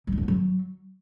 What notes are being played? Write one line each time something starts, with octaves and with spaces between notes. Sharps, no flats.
G3
D#4
F3
B3
F#3